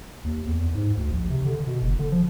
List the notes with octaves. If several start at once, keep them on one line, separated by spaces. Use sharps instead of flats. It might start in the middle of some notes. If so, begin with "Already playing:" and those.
D#2
E2
G#2
D2
A#1
C3
D3
B2
F#1
D3
F3